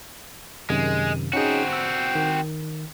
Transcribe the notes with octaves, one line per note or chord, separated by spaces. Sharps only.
F#2 C3 D#3 G#3
C4 C#4 D#4 F#4 G#4
E6
D#3